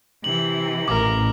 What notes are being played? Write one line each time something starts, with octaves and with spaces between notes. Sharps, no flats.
C3 E3 F#7
A1 A#4 D6